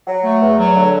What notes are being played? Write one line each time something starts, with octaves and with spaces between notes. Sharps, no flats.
F#3
A3
E2
F#3
D3